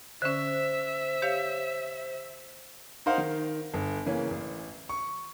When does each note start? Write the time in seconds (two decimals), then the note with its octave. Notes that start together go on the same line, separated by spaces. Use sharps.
0.22 D3 C#4 C5 E5
1.22 G4 C#5 F5
3.06 D#4 A#4 C5 F5 F#5
3.18 D#3
3.74 G1
4.06 C#3 E3 A#3 C#4
4.31 A1
4.89 C#6